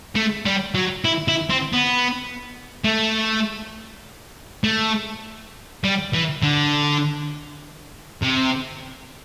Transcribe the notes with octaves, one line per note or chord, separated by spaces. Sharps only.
A3
G3
F#3
E4
E4
C4
B3
A3
A3
G3
E3
D3
C3